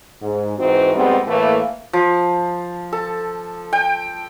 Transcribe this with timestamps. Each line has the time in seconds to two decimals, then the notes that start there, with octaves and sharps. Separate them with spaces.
0.22 G#2
0.59 G#2 E3 C4 D#4 F#4
0.95 F2 G#2 G3 B3 C4
1.27 A2 E3 A3 A#3
1.93 F3
2.93 A4
3.73 G5